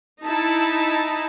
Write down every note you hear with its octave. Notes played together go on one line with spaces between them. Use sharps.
D#4 E4 A5